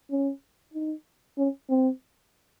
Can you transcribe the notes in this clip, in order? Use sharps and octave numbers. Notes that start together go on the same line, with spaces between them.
C#4
D#4
C#4
C4